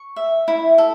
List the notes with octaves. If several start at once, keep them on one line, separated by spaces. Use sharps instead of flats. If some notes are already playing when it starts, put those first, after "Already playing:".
Already playing: C#6
E5
E4
A4